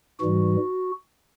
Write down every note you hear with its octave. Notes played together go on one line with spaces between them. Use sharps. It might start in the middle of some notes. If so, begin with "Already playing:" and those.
G#2 E3 G3 F#4